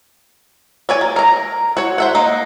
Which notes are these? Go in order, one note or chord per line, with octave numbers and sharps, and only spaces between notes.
C#5 D5 G#5
A#3
A#4 A#5
F#4 C#5
C5 E5 F#5
A#3 D#4